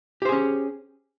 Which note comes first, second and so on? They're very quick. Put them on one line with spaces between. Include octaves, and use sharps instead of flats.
G4 C5 G#4 C#4